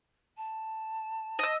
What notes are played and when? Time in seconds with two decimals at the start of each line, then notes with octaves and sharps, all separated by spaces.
0.37 A5
1.39 D#5 E6